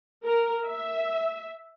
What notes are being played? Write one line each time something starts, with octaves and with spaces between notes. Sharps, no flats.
A#4
E5